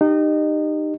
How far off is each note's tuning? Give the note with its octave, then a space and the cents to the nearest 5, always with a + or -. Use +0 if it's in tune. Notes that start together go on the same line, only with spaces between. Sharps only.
D#4 -25 G4 +5 D#5 -20